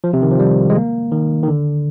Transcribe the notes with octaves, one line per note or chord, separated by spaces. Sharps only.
F3
C3
D#3
F3
G3
G#3
A#3
D#3
D#3
D3